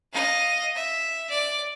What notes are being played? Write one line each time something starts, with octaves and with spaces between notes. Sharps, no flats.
D#5 F5
E5
D5